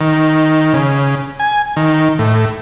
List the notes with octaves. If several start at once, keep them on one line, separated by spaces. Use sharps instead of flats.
D#3
C#3
G#5
D#3
A2